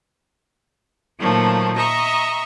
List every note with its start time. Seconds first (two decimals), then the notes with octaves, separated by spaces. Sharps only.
1.19 A#2 D#3 F3 F#3 A3 A#3
1.76 D#5 E5 A#5 C#6